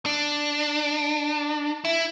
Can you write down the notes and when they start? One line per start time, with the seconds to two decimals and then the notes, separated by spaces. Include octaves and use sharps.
0.06 D4
1.85 E4